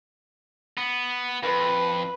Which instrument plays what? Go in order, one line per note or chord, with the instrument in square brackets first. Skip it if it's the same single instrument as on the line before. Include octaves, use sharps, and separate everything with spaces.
[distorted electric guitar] B3
[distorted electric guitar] F2 [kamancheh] B4